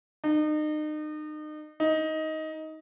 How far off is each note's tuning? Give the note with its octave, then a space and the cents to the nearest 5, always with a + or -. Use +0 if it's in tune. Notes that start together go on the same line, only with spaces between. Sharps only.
D#4 -35
D#4 +15